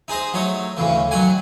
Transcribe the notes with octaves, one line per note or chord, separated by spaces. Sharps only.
D#4 G#4 C5 D#5
F#3 A3 D#4 C#5
D2 A2 C#3 E3
F#2 D#3 F#3 F#5 G#5